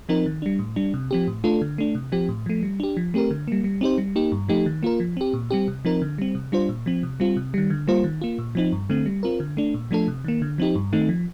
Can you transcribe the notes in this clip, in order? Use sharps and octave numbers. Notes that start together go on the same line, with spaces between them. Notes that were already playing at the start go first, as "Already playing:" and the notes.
F3 C4 D#4 A#4
D#3
G3 D4
A2
G3 D4
C3
F3 C4 G4
A2
A3 D4 F4 A4
D3
A3 D4
C3
F3 C4 G4
A2
F3 A3
G3
D4 G4
F3
A3 C4 G4 A#4
D3
G3 A#3
G3
C4 D#4 G4 C5
G3
A#3 D#4 G4
G2
F3 A3 D#4 G4
D#3
A#3 F4 A#4
F3
C4 G4
A#2
G3 C4 G4
C3
F3 C4 D#4 A#4
D3
G3 C4
C3
G3 D4 F4 C5
A#2
F3 C4
C3
G3 C4 F4
C3
D#3 G3
D3
G3 A#3 F4 C5
D#3
A#3 F4
A#2
F3 C4 D#4
G2
D3 A3 C4
G3
C4 F4 A#4
D3
A3 D4
A#2
F3 A3 D4 A4
C3
D#3 A#3
D3
F3 C4 D#4 G4
G2
D#3 A3 C4 D#4
F3